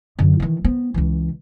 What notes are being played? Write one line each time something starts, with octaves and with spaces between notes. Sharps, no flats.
F#2 D3
D#3 E3
B3 C4
C#2 E3